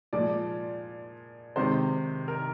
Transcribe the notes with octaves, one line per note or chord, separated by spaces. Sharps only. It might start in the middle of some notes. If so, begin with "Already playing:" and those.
A#2 F3 G#3 D5
C3 D#3 G#3 C5
A#4